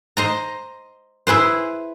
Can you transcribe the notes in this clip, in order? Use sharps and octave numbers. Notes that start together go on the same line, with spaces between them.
C5 D#5 A#5
E4 G#4 B4 C5